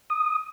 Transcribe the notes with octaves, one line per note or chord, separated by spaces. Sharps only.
D#6